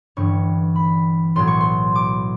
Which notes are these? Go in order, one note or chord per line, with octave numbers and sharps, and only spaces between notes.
G1 G2 E3 G3 C#6
B5
B1 A2 F#3 C6
C#6
C6
D6